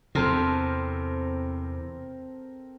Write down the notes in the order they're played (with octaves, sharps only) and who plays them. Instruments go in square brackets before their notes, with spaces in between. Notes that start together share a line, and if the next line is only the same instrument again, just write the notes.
[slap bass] E2 C3 [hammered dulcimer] C4 A4 A#4